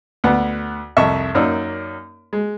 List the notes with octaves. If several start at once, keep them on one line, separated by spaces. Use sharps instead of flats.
D2 B3 F#5
C2 F2 D#5 E5 C#6
F#2 A#3 C#4 D#4 D5 E6
G#3